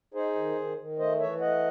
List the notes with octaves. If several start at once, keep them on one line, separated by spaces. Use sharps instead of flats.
D#4 G#4 C5
D#3
D#3
D#3
A3 C5 D#5
E3 C#5 E5
A3 D#5 F#5